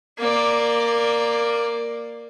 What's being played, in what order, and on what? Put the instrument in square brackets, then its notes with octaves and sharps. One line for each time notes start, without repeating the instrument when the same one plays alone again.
[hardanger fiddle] A#3 D5